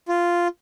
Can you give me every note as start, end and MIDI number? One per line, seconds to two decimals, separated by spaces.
0.08 0.48 65